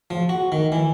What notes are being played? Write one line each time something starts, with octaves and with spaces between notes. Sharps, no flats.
F3
F#4
D#3
E3